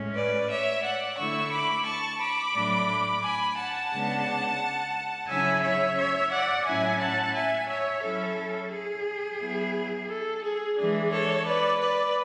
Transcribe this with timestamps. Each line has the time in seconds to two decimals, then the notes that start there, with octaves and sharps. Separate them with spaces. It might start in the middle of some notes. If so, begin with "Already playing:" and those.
Already playing: A2 G#3 C#4
0.15 B4 D5
0.49 C#5 E5
0.83 D5 F#5
1.17 D3 A3 E4 C#6 E6
1.52 B5 D6
1.85 A5 C#6
2.20 B5 D6
2.54 A2 F#3 A3 D4
3.22 G#5 B5
3.57 F#5 A5
3.92 C#3 G#3 B3 D4
5.28 C#3 F#3 C#4 E4 E5 G#5
5.63 C#5 E5
5.97 C#5 E5
6.31 D5 F#5
6.65 A2 F#3 C#4 E4 E5 G#5
6.99 F#5 A5
7.34 E5 G#5
7.69 C#5 E5
8.02 F#3 C#4 E4 A4
8.71 G#4
9.40 F#3 B3 E4
10.09 A4
10.43 G#4
10.77 E3 G#3 D4 G#4
11.11 A4 C#5
11.45 B4 D5
11.80 B4 D5